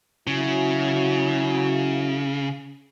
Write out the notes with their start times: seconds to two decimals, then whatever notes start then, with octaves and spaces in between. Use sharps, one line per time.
0.27 C#3 F#3 E4 F#4